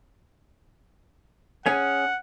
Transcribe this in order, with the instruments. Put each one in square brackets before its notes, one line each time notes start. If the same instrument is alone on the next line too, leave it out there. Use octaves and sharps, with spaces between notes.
[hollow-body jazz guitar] C#4 G#4 [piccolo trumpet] F#5